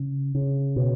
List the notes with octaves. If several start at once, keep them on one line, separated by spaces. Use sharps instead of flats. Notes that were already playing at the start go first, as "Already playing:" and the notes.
Already playing: C#3
C#3
B2